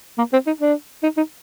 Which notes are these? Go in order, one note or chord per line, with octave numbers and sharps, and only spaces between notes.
A#3
C4
D#4
D4
D#4
D#4